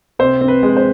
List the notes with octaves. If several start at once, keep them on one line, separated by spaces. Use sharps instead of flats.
C3 C5
C4
B4
G#3
C5